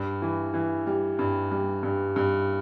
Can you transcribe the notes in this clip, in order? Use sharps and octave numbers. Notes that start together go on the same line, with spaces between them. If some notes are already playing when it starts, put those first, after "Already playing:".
Already playing: G2
E3
E3
G3
G2
G3
G2
G2